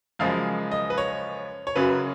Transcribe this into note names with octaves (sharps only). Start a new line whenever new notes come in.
F#2 C#3 F3 G#3 F5
D#5
B4
C#5
C#5
F#2 C#3 F#3 B4